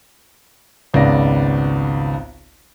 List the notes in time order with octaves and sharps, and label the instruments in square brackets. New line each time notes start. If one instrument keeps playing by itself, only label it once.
[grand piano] G#1 C#2 G#2 B3 D5 A#6